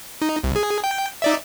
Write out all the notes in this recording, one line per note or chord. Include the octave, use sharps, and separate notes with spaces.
D#4
C2
G#4
G5
D#4 D5 E5